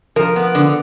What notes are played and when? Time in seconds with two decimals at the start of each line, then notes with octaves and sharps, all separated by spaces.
0.16 F3 A#4
0.36 B3
0.55 D3